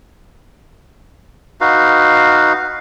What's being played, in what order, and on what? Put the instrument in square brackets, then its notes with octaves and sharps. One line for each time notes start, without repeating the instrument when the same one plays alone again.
[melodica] D#4 F#4 B4 F5